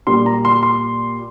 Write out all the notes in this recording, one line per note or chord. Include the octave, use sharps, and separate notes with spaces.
A#2 G3 C6
A#5
C6
C6